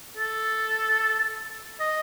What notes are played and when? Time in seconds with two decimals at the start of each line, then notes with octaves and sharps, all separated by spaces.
0.17 A4
1.80 D#5